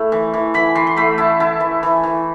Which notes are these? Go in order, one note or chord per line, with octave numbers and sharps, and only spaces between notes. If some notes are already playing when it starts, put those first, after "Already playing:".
Already playing: A3 E4
E3
E3
E3 B5
E3 C6
C6
A3 B5
E4 A5
E4 A5
E3
E3
E3